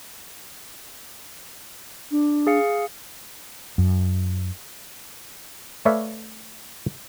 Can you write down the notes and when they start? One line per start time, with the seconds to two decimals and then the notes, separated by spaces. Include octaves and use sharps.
2.11 D4
2.47 G#4 F5 C#7
3.78 F#2
5.85 A3 B4 C#5 D5 E5 F5